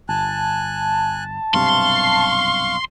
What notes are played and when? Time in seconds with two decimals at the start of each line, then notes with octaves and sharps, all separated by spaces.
0.09 G1 G#5 A5 F#6
1.54 B1 G2 C3 F5 C6 C#6